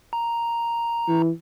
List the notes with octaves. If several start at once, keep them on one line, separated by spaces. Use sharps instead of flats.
A#5
E3